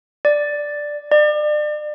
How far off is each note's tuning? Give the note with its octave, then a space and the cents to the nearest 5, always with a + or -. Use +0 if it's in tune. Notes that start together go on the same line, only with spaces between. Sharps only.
D5 +0
D5 +35